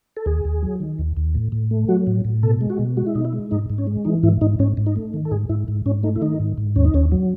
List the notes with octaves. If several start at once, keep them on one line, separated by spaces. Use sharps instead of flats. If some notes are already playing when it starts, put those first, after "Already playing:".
A4
D#2 G#4
D#2
F#3
D#3
D#2
D#2
A2
A2
A3
F#3 F#4
A2
A2
B2 A4
G#3
F#4
B2
G#3 F#4
E4
B2 D#4
E4
G#3
G#2 D#4
G#2
C#4
G#3
E3 D#4
G#2 E4
G#2 D#4
G#2 C#4
G#2
D#4
A3
D#3
A4
G#2 G#4
G#2 E4
G#2
G#2 C#4
A3 D#4
E4
D#3 D#4
G#2
G#2
D#2 C#4
D#4
D#2 C#4
F#3